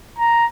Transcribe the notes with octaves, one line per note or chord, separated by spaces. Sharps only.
A#5